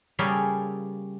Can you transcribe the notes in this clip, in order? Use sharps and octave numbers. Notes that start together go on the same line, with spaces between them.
C#3 G3 A#3 C#4 G#4 A4